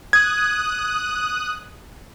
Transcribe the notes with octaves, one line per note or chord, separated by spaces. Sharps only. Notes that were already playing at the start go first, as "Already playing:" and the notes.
D#6 F#6 G#6